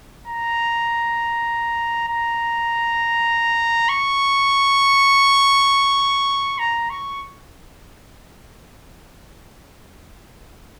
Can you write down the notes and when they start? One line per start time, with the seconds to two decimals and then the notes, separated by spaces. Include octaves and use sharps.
0.28 A#5
2.08 A#5
3.89 C#6
6.59 A#5
6.90 C#6